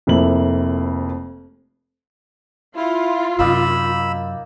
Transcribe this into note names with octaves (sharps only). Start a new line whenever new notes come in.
F1 F2 A#3 E4 F#7
E4 F4
F#2 C3 A#3 D#4 D5 B5 E6